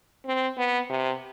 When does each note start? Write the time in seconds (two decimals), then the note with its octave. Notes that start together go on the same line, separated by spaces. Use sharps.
0.25 C4
0.57 B3
0.90 C3